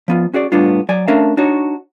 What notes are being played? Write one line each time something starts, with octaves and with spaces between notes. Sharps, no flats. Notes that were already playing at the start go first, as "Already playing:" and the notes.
F3 B3 F4
C#4 F#4 G#4 D5
A2 G3 B3 D4 F4
F#3 D5 G#5
A3 C#4 D4 A#4 E5 F5
D4 D#4 F#4 C#5